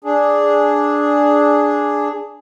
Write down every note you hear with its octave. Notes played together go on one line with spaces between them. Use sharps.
D4 G#4